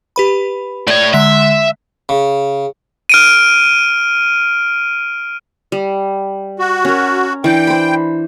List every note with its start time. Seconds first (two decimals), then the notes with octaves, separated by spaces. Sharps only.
0.16 G4 B4 B5
0.88 A2 C#5 D5
1.14 D3 G#3 E5 B6
2.09 C#3
3.09 F6 D7 D#7
5.72 G3
6.59 F#4
6.85 C#4 A#4
7.44 E3 D4 G5
7.67 C5 B5